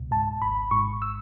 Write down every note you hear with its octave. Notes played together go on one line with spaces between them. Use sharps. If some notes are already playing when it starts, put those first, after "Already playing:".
Already playing: C#2 B2
G#2 A5
G#1 B5
G#2 C#6
E6